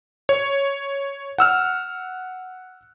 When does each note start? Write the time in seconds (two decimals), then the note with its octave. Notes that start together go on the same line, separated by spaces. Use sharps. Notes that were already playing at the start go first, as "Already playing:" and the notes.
0.29 C#5
1.38 F#5 E6 F6